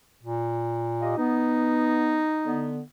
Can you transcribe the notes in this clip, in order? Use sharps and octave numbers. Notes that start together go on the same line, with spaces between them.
A#2
F4 G4 D#5
B3 D#4
D3 B3